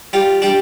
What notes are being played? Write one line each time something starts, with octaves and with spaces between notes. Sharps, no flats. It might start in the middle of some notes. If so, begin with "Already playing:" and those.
G3 F4
G3 D4